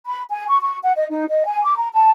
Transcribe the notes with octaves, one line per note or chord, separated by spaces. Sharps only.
B5
G#5
C#6
C#6
F#5
D#5
D#4
D#5
G#5
D6
A#5
A5